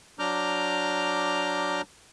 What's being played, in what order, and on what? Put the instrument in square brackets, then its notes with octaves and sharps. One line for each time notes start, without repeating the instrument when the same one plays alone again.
[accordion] F#3 D4 A#5 D6 F6 G6